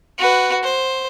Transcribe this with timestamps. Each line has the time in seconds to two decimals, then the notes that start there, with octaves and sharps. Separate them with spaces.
0.18 F#4 B4
0.63 C5